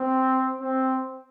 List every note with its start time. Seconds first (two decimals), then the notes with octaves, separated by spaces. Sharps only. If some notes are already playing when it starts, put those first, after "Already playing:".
Already playing: C4
0.61 C4